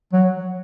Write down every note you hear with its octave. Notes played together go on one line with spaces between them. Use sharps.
F#3